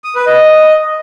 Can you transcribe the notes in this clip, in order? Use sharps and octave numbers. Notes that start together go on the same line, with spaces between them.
D#6
B4
D#5